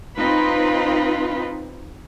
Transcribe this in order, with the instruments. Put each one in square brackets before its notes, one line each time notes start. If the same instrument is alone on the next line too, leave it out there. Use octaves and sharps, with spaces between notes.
[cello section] C4 D#4 F4 B4